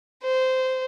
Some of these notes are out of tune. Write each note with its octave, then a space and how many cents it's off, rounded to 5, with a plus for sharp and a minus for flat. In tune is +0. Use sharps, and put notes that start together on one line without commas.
C5 -15